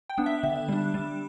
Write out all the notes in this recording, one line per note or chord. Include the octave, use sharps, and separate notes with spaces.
G5
B3 D4
E5
D3 E5
G3 D4
G3